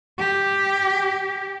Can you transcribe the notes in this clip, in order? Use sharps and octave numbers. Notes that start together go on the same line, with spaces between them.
G4